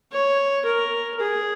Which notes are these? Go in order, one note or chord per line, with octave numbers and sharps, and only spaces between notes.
C#5
A#4
G#4